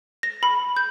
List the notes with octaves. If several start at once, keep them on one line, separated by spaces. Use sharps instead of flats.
A#6
B5
G6